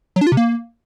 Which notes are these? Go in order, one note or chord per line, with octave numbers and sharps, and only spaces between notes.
F#3
D4
F4
C3
A#3